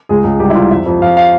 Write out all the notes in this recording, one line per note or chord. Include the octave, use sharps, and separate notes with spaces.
C#2 G#4
C#2
C2 G4
E4
C2 F4
F2 E5
F2
F2 F5
F5